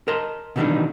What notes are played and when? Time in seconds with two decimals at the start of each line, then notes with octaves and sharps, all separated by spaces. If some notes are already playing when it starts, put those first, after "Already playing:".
0.08 A#4 D#5 A5 C6
0.56 B2 D#3 E3 G3 D4 D#4